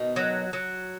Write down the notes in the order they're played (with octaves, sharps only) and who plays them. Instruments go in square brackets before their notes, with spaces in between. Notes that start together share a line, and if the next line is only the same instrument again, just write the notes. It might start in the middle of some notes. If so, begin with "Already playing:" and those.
Already playing: [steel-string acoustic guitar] B2 D#3
[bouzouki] F#3
F#3